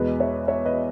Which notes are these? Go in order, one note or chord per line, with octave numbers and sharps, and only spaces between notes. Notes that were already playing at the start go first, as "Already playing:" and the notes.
Already playing: E2 B2 G#3 B4 D#5
C#5 E5
C#5 E5
B4 D#5